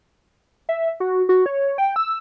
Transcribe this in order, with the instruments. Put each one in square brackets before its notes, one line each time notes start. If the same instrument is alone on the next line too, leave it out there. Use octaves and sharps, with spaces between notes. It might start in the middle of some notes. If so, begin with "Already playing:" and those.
[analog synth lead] E5
F#4
F#4
C#5
G5
E6